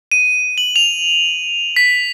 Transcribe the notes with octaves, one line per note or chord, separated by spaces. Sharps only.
D#7
F#7
F7
B6